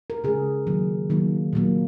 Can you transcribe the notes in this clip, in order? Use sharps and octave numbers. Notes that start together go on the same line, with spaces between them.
A#4
C#3 G#3 G#4
D#3 F#3 A#3
D#3 F#3 A#3
A#2 F#3 A#3